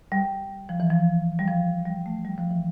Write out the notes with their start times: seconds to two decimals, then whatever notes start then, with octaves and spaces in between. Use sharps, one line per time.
0.12 G3
0.69 F3
0.80 E3
0.90 F3
1.39 G3
1.48 F3
1.86 G3
2.06 A3
2.25 G3
2.38 F3
2.51 E3